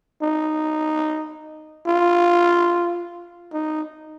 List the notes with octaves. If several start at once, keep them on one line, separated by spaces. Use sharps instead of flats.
D#4
F4
D#4